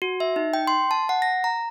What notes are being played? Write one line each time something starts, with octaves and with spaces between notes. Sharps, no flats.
F#4
E5
D#4
G5
C6
A5
F#5
A#6
A#5